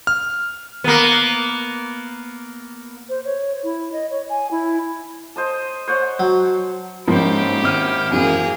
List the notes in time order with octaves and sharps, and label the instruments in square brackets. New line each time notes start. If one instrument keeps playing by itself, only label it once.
[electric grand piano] F6
[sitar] A#3 B3
[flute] C5
C#5
E4
D#5
C#5
G#5
E4
[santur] C5 D#5 A5
C5 C#5 F#5
[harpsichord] F#3
[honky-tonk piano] G#2 F3 [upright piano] A#3 C#4 [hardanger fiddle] E4 G4
[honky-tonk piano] G#1 F6 D#7
[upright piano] A1 F#2 [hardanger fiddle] A#3 G#4